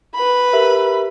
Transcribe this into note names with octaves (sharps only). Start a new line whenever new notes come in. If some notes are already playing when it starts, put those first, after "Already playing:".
B4 B5
G4 A#4 E5